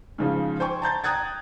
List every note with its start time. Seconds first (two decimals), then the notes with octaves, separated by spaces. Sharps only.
0.18 G#2 C#3 F3
0.60 C5 G5 G#5 C#6
0.82 A5 A#5 G6 A6
1.04 G5 A#5 D#6 F#6 G#6 A6